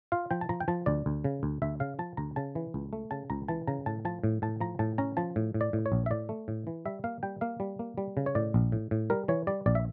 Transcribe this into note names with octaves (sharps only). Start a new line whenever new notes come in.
F4 F5
F3 G5
A5
F3 A#5
G5
F3 A5
D2 D5
D2
C#3
D2
D2 E5
C#3 F5
F3 A5
D2 A#5
C#3 A5
E3
C#2
A3
C#3 A5
C#2 A#5
E3 A5
C#3 A#5
A2 A5
F3 A5
A2
A2 A5
F3 A#5
A2 A5
C#4 A#5
F3 A5
A2
A2
D5
A2
C#5
A#1
E5
A2 D5
A3
A2
E3
G3 E5
A#3 F5
G3 G5
A#3 F5
G3
A#3
G3
C#3
C#5
A2 D5
A#1
A2
A2
G3 A#4
E3 C#5
G3 D5
A#1 D5
E5